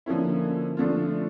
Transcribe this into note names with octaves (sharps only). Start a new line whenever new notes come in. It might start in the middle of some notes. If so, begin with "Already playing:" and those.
D3 F3 A#3 C#4 E4
D3 F3 A3 D4 F4